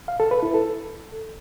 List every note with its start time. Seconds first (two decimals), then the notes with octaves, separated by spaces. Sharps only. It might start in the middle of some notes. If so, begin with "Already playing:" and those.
0.08 F5
0.20 A4
0.31 B4
0.43 E4
0.54 A4